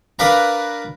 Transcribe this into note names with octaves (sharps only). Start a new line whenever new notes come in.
D4 A#4 B4 F5 A#5